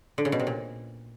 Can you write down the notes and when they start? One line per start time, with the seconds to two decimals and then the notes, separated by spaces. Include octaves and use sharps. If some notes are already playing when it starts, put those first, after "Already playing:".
0.18 D3
0.25 C#3
0.32 B2
0.40 C3
0.47 A#2